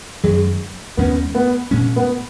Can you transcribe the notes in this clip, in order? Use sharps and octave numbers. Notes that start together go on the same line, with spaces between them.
F#2 D#3 F#3 G#3
D#2 D#3 G#3 B3 C#4
B3
A#2 G#3 C#4
B3